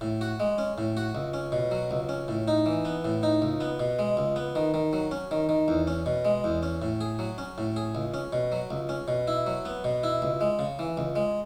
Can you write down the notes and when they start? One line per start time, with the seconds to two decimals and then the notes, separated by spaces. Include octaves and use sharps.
0.01 A2
0.21 F#4
0.40 G#3
0.58 C#4
0.78 A2
0.97 F#4
1.15 C#2
1.34 C#4
1.52 B2
1.71 F#3
1.91 C#2
2.09 C#4
2.28 A2
2.48 D#4
2.66 E3
2.85 B3
3.05 A2
3.23 D#4
3.42 C#2
3.60 B3
3.80 B2
3.99 G#3
4.17 C#2
4.36 B3
4.55 D#3
4.74 D#3
4.93 F#3
5.11 C#4
5.31 D#3
5.49 D#3
5.68 E2
5.87 C#4
6.06 B2
6.25 G#3
6.44 E2
6.63 C#4
6.82 A2
7.01 G#4
7.19 F#3
7.38 C#4
7.58 A2
7.76 G#4
7.95 C#2
8.14 C#4
8.33 B2
8.52 F#3
8.71 C#2
8.89 C#4
9.08 B2
9.27 E4
9.47 F#3
9.65 B3
9.84 B2
10.03 E4
10.22 C#2
10.41 G#3
10.59 C#3
10.79 E3
10.97 C#2
11.16 G#3